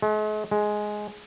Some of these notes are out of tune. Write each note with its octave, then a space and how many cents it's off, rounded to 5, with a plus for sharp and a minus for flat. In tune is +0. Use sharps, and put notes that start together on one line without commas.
G#3 +45
G#3 +10